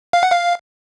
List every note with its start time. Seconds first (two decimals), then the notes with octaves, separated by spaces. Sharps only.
0.13 F5
0.23 F#5
0.31 F5